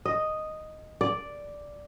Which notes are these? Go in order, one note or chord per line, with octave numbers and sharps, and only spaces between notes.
D#5
D5